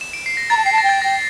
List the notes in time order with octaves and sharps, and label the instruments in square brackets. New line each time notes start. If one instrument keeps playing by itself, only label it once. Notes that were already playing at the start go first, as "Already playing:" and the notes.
[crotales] E7
D7
C7
A#6
[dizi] A#5 [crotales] A6
[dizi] A5
[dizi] G5 [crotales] C7
[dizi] A5
[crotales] A#6
[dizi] G5
[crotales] A6
[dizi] G5 [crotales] A#6